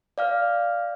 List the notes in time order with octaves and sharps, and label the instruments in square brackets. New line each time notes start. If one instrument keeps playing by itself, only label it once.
[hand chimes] D5 F5 F6